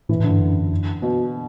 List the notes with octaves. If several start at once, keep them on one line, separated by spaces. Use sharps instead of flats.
A2 E3
A2 D3
G2
F#2
B2